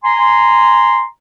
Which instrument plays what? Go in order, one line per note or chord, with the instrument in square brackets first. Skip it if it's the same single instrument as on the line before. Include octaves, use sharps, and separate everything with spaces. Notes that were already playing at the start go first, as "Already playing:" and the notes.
[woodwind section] G#5 A#5 C6